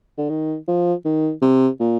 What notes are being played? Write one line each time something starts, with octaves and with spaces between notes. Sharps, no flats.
D3
D#3
F3
D#3
C3
A#2